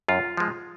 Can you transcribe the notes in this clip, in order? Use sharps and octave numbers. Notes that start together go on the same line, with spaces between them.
F#2 F4
F3 G#3